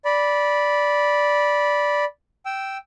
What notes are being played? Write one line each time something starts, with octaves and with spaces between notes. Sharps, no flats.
D5 B5
G5 E6